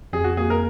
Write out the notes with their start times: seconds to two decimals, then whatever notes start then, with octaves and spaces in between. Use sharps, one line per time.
0.13 F2 G#4
0.24 F#4
0.37 A#3 G#4
0.50 A#4